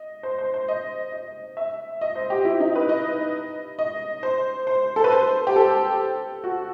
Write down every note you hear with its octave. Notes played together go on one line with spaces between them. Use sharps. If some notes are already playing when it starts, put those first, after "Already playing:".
Already playing: D#5
C5
C5
C5
D#5
D#5
E5
D#5
C5
G4
E4
D#4
B4
D#5
D#5
C5
C5
A4
B4
C5
G4
A4
F#4